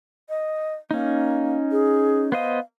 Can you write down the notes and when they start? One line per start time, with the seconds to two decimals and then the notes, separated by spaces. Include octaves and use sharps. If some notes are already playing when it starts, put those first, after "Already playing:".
0.29 D#5
0.91 A#3 C#4 D#4
1.72 G#4
2.32 B3 C5 D#5 F5